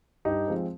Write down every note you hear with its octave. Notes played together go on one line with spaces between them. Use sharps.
G2 D#4 G4
F3 G#3 C4